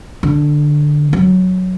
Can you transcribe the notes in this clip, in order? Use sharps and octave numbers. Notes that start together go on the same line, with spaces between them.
D3
F#3